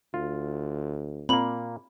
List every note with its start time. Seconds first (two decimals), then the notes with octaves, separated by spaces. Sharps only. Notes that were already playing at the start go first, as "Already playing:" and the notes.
0.14 D2 F4
1.29 A#2 A#3 C4 B5 F#7